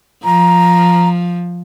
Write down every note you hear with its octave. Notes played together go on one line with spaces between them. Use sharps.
F3 A#5